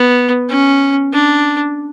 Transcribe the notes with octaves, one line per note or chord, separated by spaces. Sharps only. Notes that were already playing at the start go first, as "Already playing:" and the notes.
Already playing: B3
C#4
D4